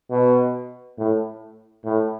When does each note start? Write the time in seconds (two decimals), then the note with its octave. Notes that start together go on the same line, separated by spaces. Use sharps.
0.10 B2
0.98 A2
1.85 A2